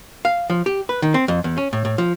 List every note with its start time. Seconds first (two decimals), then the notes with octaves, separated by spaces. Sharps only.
0.25 F5
0.50 F3
0.66 G4
0.89 B4
1.02 D#3
1.14 C4
1.28 F2
1.44 E2
1.58 C#4
1.73 A2
1.85 A2
1.98 F3